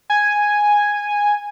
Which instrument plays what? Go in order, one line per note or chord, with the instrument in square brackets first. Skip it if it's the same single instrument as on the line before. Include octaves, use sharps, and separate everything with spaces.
[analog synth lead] G#5